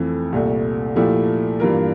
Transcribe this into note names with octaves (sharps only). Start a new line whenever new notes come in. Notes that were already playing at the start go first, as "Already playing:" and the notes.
Already playing: F2 E3 A3
C2 A#2 A3
A#2 F3 A3 E4 G4
G2 E3 A#3 F4 A#4